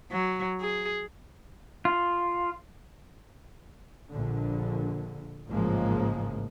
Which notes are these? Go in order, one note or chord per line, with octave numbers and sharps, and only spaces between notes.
F#3
G#4
F4
A#1 D3
A1 G#2 C#3 F3 G#3 A#3